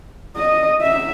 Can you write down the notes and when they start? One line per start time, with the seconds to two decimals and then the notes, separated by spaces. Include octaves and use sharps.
0.36 D#5
0.82 E5